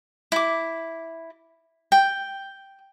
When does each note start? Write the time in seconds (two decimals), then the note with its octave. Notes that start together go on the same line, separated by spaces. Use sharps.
0.32 E4 D6
1.92 G5